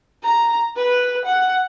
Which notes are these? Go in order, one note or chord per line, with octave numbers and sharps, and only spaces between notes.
A#5
B4
F#5